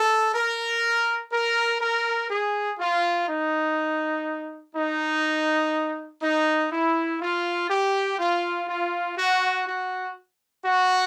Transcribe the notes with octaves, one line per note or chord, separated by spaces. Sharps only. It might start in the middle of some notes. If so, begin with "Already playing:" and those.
Already playing: A4
A#4
A#4
A#4
G#4
F4
D#4
D#4
D#4
E4
F4
G4
F4
F4
F#4
F#4
F#4